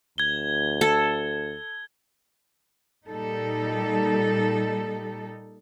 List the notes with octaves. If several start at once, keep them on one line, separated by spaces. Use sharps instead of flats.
D2 G#6 G7
A4
A#2 G3 D#4 A4